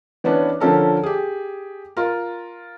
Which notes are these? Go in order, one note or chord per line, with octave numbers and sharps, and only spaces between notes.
E3 B3 C#4 D4
D3 F3 C#4 A4 A#4
G4 G#4
F4 A#4